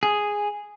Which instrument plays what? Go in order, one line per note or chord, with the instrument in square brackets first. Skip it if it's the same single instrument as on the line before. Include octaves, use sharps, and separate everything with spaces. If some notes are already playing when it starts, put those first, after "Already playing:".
[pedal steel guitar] G#4